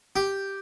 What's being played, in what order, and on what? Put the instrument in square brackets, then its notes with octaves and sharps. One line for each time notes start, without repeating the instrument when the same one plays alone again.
[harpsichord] G4